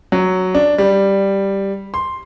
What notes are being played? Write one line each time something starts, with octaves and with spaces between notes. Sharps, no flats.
F#3
D4
G3
C6